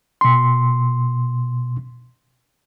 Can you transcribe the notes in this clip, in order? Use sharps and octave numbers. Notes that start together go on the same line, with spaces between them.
B2 C6